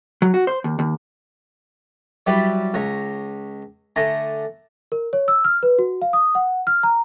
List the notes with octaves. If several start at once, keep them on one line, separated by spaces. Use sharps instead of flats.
F#3
F#4
C5
D#2
D#2
F#3 G3 E4 G4 B4 D5
C#2 C#5 A#5
D3 A3 G#5 A#5
A#4
C#5
E6
F6
B4
F#4
F5
D#6
F#5
F6
A#5